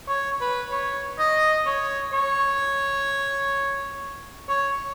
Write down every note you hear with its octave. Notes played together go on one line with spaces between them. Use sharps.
C#5
B4
C#5
D#5
C#5
C#5
C#5